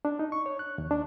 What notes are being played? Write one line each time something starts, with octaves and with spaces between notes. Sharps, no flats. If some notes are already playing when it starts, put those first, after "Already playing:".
D4
D#4
C#6
C#5
F#6
D#2
D4